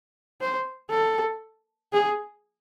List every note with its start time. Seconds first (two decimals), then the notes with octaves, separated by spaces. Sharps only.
0.41 C5
0.91 A4
1.93 G#4